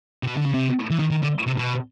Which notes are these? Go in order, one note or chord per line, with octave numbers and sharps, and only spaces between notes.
C3
B2
D3
C#3
C3
E3
D#3
D#3
D3
C3
B2